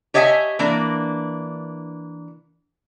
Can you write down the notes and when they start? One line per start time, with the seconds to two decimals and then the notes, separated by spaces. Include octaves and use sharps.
0.14 G4 C#5 D#5 E5 F#5 G#5
0.59 E3 A#3 D4